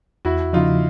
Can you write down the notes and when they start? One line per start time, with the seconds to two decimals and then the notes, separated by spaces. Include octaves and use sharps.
0.25 E2 E4 F#4
0.53 C#3 F3 D#4 F4